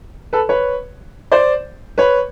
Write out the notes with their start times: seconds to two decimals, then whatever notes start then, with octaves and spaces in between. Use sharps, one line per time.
0.33 A4 B4
0.49 B4 C#5
1.32 C5 D5
1.98 B4 C#5